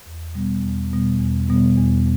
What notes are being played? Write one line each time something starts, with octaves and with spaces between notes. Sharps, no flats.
E2
B2 G3 B3
E2
B2 G3 B3
E2
B2 G3 B3
E2